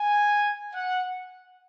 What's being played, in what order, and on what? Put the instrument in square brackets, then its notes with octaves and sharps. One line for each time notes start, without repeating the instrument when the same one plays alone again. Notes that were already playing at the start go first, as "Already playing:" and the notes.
Already playing: [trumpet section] G#5
F#5